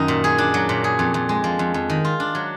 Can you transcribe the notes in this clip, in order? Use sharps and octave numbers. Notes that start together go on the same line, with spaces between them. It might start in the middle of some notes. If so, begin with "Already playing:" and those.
Already playing: F#2 D#3 D#4
A#2
G#4
D4
F#3
A#2
G#4
F2
F2
G#3
F3
F2
F2
D#3
F4
D4
F#3